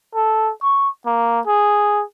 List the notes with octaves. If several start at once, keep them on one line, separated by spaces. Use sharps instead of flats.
A4
C#6
A#3
G#4